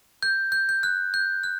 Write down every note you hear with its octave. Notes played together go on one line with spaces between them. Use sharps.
G6
G6
G6
F#6
G6
F#6